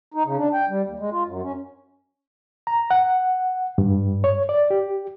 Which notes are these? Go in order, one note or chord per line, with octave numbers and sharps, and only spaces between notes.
D#4
C#3
D4
G5
G3
D#2
G#3
F4
F#2
C#4
A#5
F#5
G2
C#5
D5
G4